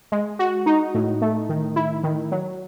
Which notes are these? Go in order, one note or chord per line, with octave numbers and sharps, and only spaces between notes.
G#3
F#4
D#4
A2
A3
D#3
E4
D#3
F#3